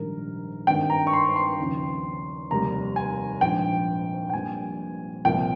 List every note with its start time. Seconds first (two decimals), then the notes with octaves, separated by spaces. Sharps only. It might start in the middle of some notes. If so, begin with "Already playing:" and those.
Already playing: A#1 G#2 D#3 G3 A#4
0.67 G#1 G2 D#3 G5
0.90 A#5
1.07 C#6
1.13 C6
1.36 C6
1.59 D#2 C#3 F3
2.50 F1 D#2 D#3 G3 A#5
2.96 G#5
3.41 A#1 G#2 F3 G5
4.30 G5
4.33 A#1 A#2 G3 G#5
5.25 C2 A#2 F3 G5